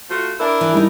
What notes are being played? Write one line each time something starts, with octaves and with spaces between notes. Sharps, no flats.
A3 F4 F#4
D4 E4 A#4
E3
G3 D#4